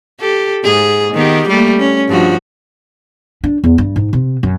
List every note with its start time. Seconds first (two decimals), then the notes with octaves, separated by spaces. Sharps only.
0.20 G4 A4
0.64 G#2 G#4
1.13 D#3 B3 G4
1.48 G3 A3 A#3
1.79 C#4
2.08 G2 F3 F#4
3.44 D4
3.64 E2
3.78 G2
3.96 G#2
4.13 C3
4.43 F#2